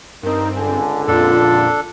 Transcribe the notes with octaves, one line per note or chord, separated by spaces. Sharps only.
G2 C4 D#4 A#4
C#2 D3 G#5
F2 A#2 D4 F4 A4